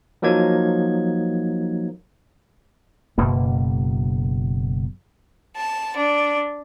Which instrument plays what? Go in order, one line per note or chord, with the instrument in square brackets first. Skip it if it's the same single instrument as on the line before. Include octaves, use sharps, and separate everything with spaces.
[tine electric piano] F3 F#3 A#3 D#4 G#6
[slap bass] F#1 F#2 B2 A#3
[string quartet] A5
D4